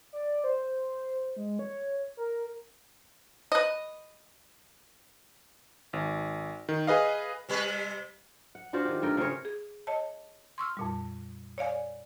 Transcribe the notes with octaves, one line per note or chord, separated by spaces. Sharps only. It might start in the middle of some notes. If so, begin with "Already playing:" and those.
D5
C5
G#3
C#5
A#4
B4 D#5
G#1
D#3
G#4 B4 D#5 F5
C3 G3 B4
F#5
D4 F4 F#4 C5
D#3 G4
G2 A3 A#4 G5
C#3 A#4 C5 C#5
G#4
C#5 D#5 A5
C6 C#6 E6 F6
F2 A#2 G3
C#5 D5 F5 G#5